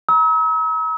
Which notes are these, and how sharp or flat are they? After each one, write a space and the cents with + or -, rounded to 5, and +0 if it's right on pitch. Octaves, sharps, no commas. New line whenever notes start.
A#5 +35 E6 -45